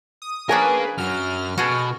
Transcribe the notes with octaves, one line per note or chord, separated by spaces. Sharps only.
D#6
F3 C#4 D4 G#4 A#4 B4 F5 G#5
F#2 F#3 F6
B2 F#4 G#4 A4